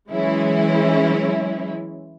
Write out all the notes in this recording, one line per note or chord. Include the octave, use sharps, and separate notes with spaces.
E3 F#3 G#3 C#4 E4